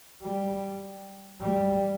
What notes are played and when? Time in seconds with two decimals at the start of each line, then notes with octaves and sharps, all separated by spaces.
0.22 G3
1.41 G3